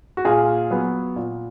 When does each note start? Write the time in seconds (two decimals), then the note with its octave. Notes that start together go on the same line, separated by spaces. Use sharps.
0.17 F#4
0.25 A#2 F4 G#4
0.71 F#3 B3
1.16 A#2